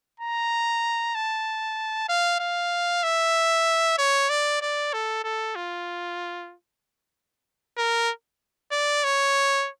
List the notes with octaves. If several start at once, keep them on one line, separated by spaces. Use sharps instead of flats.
A#5
A5
F5
F5
E5
C#5
D5
D5
A4
A4
F4
A#4
D5
C#5